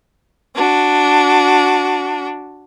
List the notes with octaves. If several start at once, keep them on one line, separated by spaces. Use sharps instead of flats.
D4 F#4